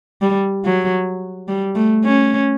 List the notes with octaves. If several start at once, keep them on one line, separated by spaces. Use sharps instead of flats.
G3
F#3
G3
A3
C#4